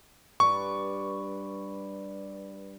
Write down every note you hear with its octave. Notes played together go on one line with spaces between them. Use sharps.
G2 B4 D5 C#6